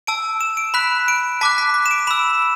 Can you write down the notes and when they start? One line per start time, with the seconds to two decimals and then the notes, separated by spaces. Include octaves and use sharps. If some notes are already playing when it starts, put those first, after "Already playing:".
0.07 A5 E6 D7
0.41 E7
0.57 D7
0.74 B5 F#6 B6
1.08 D7
1.41 A5 D6 F#6 B6
1.58 B6
1.74 B6
1.86 E7
1.91 D7
2.07 B5 E6 E7